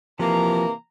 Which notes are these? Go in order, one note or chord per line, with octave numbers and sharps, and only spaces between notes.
C3 E3 F3 A#3 A#5